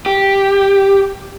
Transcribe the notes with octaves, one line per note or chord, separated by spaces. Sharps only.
G4